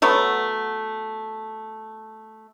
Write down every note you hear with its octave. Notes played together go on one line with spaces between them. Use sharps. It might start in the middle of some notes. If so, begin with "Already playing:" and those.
F#3 A3 B3 C#5